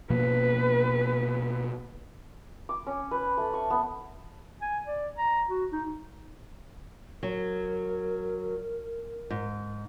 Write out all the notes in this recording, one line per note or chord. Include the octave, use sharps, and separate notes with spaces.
B2 F3 A#3 B4
D6
C#4
B4
A3
C#6
B3
G#5
D5
A#5
F#4
D#4
F#3 A#4
G#2